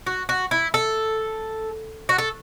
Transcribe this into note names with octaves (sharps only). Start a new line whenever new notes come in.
F#4
F#4
E4
A4
F#4
A4